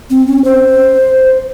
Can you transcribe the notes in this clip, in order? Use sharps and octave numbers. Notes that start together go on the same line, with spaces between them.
C4
C#4
C5